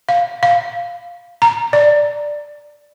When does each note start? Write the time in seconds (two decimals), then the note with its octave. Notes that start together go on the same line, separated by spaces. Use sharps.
0.09 F5
0.43 F5
1.42 A#5
1.73 D5